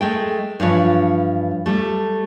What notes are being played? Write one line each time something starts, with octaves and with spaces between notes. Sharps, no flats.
G#3 A3 G5
G2 E3 F3 C#5
G3 A3